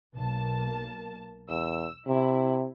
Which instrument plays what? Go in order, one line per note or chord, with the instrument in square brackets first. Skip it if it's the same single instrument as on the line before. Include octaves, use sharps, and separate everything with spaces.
[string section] B1 A#3 A5
[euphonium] E2 [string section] E6
[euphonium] C3 [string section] E4